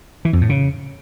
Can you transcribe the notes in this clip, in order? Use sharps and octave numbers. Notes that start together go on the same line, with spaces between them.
E3
F2
A2
C#3